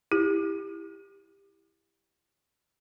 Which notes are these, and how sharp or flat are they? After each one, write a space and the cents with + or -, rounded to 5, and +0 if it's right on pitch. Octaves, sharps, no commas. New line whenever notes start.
E4 +0 G4 +20